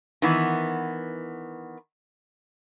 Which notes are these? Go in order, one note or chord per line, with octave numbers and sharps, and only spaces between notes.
D#3 E3 B3